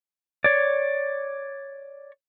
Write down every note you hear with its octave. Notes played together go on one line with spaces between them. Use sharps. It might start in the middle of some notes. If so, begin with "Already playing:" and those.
C#5 D5